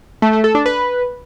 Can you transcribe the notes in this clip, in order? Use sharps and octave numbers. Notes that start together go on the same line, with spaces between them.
A3
A3
A4
D4
B4